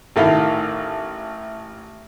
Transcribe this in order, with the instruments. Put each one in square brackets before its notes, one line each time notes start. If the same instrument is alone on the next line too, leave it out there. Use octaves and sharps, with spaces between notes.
[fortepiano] A1 D#3 E4 A4 F5